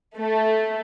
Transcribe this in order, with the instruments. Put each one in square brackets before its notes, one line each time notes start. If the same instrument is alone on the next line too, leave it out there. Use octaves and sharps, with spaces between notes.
[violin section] A3